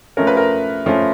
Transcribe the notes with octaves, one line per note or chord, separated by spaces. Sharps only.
F3 A3 C#4 A#4
B4
A#4
F3 A3 C#4